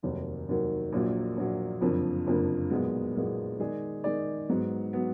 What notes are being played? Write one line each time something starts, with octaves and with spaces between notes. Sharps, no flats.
F1 D#2 D#3 F#3
F1 D#2 D#3 F#3
A#1 A#2 F#3 A#3
A#1 A#2 F#3 A#3
F#1 F2 D3 F3 A#3
F#1 F2 D3 F3 A#3
B1 A#2 G#3 B3
B1 A#2 G#3 B3
D#3 G#3 D#4 G#4 D5
D#3 G#3 D#4 G#4 D5
G#2 F#3 B3
F#3 B3